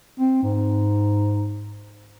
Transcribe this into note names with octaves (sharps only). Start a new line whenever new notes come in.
C4
G#2